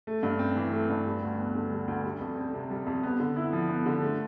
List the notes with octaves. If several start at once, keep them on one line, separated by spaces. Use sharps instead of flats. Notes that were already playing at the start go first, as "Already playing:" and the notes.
A3
G2
C4
E3
A3
G2
G3
D2
B3
D3
G3
D2
G3
F2
C4
C3
G3
F2
B3
D3
E4
F3
B3
D3
A3